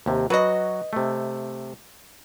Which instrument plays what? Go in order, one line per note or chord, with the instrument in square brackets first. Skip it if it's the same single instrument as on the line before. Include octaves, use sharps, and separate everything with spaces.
[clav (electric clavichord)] D#2 C3
[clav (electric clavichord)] F#3 F#4 [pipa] B4 D#5
[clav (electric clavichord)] C3 A3